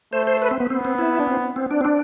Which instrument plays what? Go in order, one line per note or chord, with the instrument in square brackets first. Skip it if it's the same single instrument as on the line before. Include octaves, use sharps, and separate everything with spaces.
[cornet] A3 [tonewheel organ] C5
[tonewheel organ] C5
B4
C4
B3
[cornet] B3 [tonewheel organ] C4
[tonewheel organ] C4
E4
D4
C4
C4
D4
C4
D4